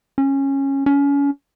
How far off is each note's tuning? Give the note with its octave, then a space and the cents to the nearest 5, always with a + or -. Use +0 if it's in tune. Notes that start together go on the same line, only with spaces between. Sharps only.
C#4 -15
C#4 +30